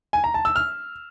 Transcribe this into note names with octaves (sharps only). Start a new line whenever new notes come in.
G#5
A#5
A5
E6
F6